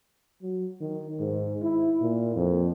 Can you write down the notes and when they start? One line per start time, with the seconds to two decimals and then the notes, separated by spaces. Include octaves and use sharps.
0.42 F#3
0.81 D#3
1.20 G#2
1.62 E4
2.01 A#2
2.36 F2